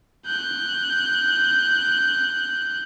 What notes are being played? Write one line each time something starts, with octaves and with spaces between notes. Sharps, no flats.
F#6 G6